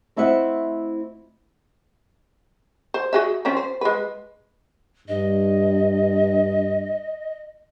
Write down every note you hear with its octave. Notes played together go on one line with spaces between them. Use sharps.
A3 C4 E4 D#5 E5 F#5
C5
F#4 G#4 E5
F3 C4 C#4
C5
G#3 B4
G2 D#5